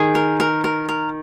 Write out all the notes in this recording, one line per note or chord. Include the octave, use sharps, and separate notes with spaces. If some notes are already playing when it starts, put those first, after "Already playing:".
Already playing: D#3 G#4
A#4
A#4
A#4
A#4